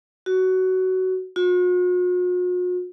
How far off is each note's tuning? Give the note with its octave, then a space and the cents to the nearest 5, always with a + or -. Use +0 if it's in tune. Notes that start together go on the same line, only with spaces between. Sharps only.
F#4 +15
F#4 -45